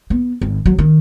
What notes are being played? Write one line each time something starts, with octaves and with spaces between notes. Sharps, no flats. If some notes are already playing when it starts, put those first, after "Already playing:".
B3
G#1
F#3
D#3